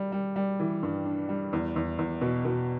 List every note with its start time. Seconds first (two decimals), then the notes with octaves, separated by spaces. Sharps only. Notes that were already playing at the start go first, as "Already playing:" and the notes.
Already playing: G3
0.12 G3
0.36 G3
0.60 E3
0.83 G2
1.06 D4
1.29 G3
1.53 E2
1.76 E2
1.99 E2
2.21 B2
2.45 B2